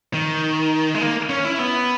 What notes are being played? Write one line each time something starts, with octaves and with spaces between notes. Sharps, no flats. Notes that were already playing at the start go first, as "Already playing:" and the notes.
D#3
G#3
A#3
C#4
E4
B3